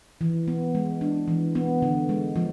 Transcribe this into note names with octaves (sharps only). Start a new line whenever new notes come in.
E3
B3
G#3
D4
E3
B3
D3
G#3
F3